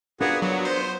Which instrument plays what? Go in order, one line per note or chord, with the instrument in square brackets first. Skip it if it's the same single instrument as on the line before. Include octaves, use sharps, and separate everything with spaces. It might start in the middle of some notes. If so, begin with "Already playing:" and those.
[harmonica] B3 F#4 G#4 [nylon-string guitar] D4 F4 A#4
[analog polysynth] F#3 [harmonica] B3
[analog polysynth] C5